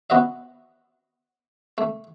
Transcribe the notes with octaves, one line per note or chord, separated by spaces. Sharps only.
B3 F#4 D#5 E5
A3